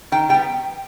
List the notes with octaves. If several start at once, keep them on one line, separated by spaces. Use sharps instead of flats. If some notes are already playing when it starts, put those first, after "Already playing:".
D#3 G5
G3 B3 G5